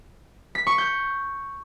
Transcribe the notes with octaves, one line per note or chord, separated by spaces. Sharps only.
B6
C#6
G6